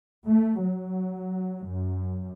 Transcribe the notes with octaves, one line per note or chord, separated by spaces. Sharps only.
A3
F#3
F#2